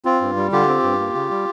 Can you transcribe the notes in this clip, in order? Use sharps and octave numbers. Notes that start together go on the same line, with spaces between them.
C4 F4
G2
G3
D3 F4 G4
C4
G2
A#3
C#3
G3